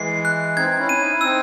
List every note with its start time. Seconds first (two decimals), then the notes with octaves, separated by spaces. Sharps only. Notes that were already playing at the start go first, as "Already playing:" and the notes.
Already playing: E3 G#3 C7
0.25 F#6
0.56 C4 D#4 G#6
0.70 D#4
0.78 C#4 E4
0.89 D#7
1.00 D#4
1.12 E4
1.21 C4 D#4 E6